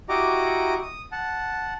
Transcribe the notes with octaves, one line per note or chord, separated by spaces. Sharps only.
E4 F#4 G4 D#5 A#5 D6
D#6
F#5 A5